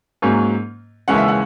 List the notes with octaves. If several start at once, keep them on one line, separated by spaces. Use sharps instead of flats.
G#2 F#3 A#3 C#4
D#2 C#3 E3 G#3 C#4 F#5
E5
F#5